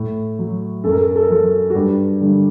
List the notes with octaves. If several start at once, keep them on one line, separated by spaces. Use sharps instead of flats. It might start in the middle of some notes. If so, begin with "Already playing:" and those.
Already playing: A2
F#3
F#2 A4
A#4
A4
A#4
A4
A#4
F#3 A4
F#4
G2 G4
D3 G3